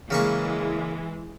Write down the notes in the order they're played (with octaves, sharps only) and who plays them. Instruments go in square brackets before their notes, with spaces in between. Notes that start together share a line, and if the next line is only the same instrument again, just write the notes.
[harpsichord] C#3 A#3 C#6 [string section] E3 G#3